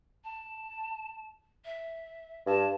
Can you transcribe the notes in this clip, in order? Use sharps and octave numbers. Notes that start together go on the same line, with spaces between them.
A5
E5
G2 A5